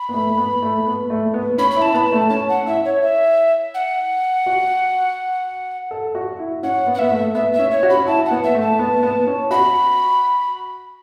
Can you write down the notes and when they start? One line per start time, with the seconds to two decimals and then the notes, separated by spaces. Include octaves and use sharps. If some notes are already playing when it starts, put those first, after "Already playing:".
Already playing: B5
0.09 B3
0.14 A3
0.38 B3
0.62 A3
0.86 B3
1.10 A3
1.34 B3
1.58 C#4 B5
1.71 B5
1.76 E4
1.81 A5
1.94 B3 B5
2.06 A5
2.12 A3
2.29 C#4 A5
2.49 F#5
2.66 E4 E5
2.85 C#5
3.02 E5
3.74 F#5
4.46 F#4
5.91 A4
6.15 F#4
6.39 E4
6.63 C#4 F#5
6.87 B3
6.94 F#5
6.98 B3 E5
7.11 A3
7.34 B3 E5
7.53 E5
7.59 C#4
7.71 C#5
7.83 F#4
7.89 B5
7.97 C#4
8.07 E4 A5
8.25 F#5
8.31 B3
8.43 E5
8.55 A3
8.61 A5
8.79 B3
9.03 B3
9.27 C#4
9.50 F#4 B5